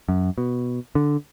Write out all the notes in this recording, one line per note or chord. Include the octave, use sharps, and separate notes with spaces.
F#2
B2
D3